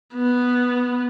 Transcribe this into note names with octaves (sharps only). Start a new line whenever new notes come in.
B3